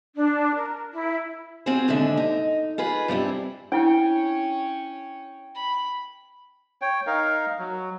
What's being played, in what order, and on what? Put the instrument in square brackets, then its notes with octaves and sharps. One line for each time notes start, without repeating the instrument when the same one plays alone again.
[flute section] D4
A#4
E4
[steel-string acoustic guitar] C4 F4 F#4 G#4 C5
D#2 G#2 D3 D4 E5
D#4
F4 G#4 B4
G2 G3 C4 E4
[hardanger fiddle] C#4 C#5 [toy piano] D4 E4 F#5 [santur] G5
[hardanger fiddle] B5
[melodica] C#5 G5
D#4 A#4 F5
F#3